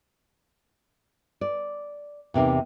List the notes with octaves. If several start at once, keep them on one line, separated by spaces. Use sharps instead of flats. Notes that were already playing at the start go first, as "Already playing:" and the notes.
D5
E2 C3 A#3 D#4